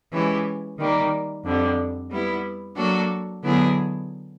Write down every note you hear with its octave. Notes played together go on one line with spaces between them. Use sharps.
E3 G#3 C#4 E4 G4
D#3 G3 A#3
F2 D3 G3
G3 B3 E4
F#3 A#3 D4 F#4 A4
D3 F#3 B3 E4 G#4